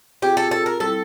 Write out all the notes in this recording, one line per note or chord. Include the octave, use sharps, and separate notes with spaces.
C4 F4 G4 G#4
A4
A4
A#4
G3 C4 E4 A4